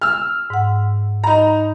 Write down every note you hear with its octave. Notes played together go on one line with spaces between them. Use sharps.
E6 F6
G#2 F#5
D#4 A#5 B5